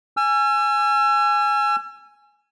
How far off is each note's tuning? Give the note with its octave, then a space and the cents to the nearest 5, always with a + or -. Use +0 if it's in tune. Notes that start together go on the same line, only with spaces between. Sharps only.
G#5 +0 E6 +40